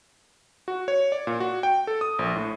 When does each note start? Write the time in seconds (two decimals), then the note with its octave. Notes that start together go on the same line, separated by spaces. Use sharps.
0.68 F#4
0.88 C#5
1.12 D5
1.27 A#2
1.40 F#4
1.63 G5
1.87 A4
2.01 D#6
2.19 A#1
2.36 A2